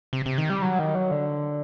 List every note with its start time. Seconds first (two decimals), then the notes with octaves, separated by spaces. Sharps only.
0.13 C3
0.26 C3
0.38 D#3
0.50 G3
0.62 F#3
0.79 D#3
0.95 F#3
1.11 D3